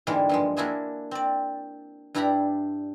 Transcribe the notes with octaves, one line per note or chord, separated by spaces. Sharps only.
G#2 D3 E3 G3 G#3 A#3
G2 F3 G#3
A#3 D4 E4 F#4 G#4 E5
C4 D5
G2 D4 E4 G4 A#5 B5